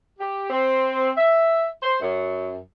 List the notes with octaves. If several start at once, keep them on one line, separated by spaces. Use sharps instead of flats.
G4
C4
E5
C5
F#2